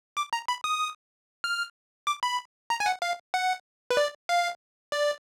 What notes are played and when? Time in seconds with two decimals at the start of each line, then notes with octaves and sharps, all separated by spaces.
0.17 D6
0.33 A#5
0.48 B5
0.64 D#6
1.44 F6
2.07 D6
2.23 B5
2.70 A#5
2.80 G#5
2.86 F#5
3.02 F5
3.34 F#5
3.91 B4
3.97 D5
4.29 F5
4.92 D5